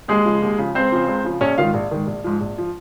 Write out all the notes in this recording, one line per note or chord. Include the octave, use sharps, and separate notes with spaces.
D#2 G#3 G#4
C#3 F3
D#2
C#3 F3
C#2 C4 C5
C#3 F3
C#2
C#3 F3
A#1 C#4 C#5
G#2 D#3 F4 F5
A#1
G#2 D#3
A#1
G#2 F3
A#1
F3